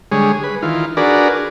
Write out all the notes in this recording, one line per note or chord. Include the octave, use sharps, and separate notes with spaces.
D3 G3 G#3 G#4 C#5
B4
D#3 E3 F4
D4 F#4 G#4 A#4 B4 D5